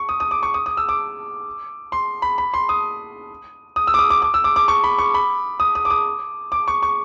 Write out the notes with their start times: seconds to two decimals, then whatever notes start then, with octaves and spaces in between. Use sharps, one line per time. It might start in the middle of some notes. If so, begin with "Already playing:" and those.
Already playing: C#6
0.09 D#6
0.20 D#6
0.31 D6
0.43 C#6
0.54 D#6
0.66 D#6
0.77 E6
0.89 D6
1.92 C6
2.22 B5
2.38 B5
2.54 C6
2.69 D#6
3.76 D#6
3.87 E6
3.94 D6
3.99 D#6
4.10 D6
4.22 D6
4.34 E6
4.44 D6
4.56 D6
4.68 C#6
4.84 B5
4.98 C#6
5.14 B5
5.60 D#6
5.75 D#6
5.85 D6
5.90 D#6
6.52 D6
6.68 C#6
6.83 C#6